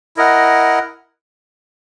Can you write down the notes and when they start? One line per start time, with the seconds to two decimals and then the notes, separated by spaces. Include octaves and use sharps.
0.17 E4 A#4 D#5 F#5